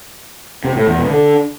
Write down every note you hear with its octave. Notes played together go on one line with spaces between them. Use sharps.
C3
A2
E2
B2
D3